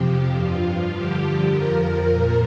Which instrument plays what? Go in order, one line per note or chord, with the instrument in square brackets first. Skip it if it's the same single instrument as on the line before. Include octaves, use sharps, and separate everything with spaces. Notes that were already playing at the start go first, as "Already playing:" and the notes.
Already playing: [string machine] F2 C3 F3 G4
G2 F3 F4
G2 D3 F3 G4
F2 F3 A#4
A#2 F3